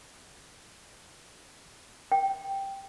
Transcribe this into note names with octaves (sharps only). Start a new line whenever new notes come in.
G5